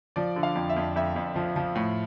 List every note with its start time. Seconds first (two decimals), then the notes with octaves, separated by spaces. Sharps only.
0.16 F3 D5
0.36 D3
0.43 F5
0.55 F2
0.69 E5
0.76 F2
0.96 F2 E5
1.16 F2
1.36 F3
1.56 F3
1.75 A2